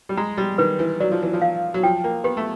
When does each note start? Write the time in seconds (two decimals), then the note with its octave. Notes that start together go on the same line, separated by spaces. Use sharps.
0.09 G3
0.17 G#3 A#5
0.38 G3
0.58 D#3 B4
0.79 E3
1.00 F#3 D5
1.11 F3
1.22 E3
1.33 F3
1.42 F5
1.74 F#3
1.83 F3 G5
2.04 A#3
2.24 B3 G4
2.37 A3